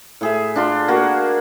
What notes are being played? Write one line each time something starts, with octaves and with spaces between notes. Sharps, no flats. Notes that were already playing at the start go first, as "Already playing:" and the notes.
A2 G#4 E5
D4 F4 C6
A#3 F#4